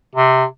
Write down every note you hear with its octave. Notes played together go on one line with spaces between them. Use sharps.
C3